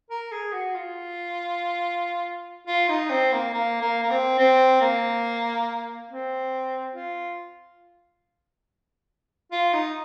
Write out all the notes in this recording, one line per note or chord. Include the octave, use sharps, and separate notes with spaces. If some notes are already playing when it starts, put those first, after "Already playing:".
A#4
G#4
F#4
F4
F4
D#4
C4
A#3
A#3
A#3
A#3
C4
C4
A#3
C4
F4
F4
D#4